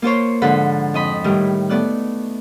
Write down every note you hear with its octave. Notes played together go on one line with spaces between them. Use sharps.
A#3 F4 C5 C#5
G#2 D3 F3 A4 F#5 B5
F2 D#5 B5
A2 D#3 G3
A3 B3 D5 F#6